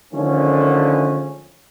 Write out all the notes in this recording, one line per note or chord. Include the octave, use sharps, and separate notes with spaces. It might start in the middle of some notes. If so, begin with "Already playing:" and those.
D3 D#3 F3 G#3 A3 C#4